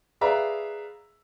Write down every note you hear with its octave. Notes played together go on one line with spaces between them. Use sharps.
G#4 B4 D5 E5 F5 A#5